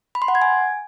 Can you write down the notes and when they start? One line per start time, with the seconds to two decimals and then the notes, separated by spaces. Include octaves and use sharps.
0.15 B5
0.22 C6
0.28 F#5
0.35 G#6
0.42 G#5